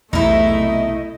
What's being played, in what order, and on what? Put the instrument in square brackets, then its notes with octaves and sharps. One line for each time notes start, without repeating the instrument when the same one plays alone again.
[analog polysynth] B1 E2 C3 [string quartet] A3 [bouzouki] D#4 E4 [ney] D#5